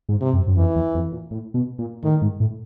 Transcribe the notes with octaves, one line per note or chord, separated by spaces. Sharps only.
G#2
C3
F#2
F#2
F2 E3
E2
F2
A#2
A2
B2
A#2
A2 D#3
G#2
A2